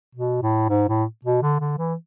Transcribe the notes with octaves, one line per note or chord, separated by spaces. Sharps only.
B2
A2
G#2
A2
B2
D3
D3
E3